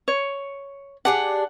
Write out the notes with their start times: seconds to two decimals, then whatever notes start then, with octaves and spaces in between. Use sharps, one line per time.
0.08 C#5
1.05 D4 G4 G#4 F#5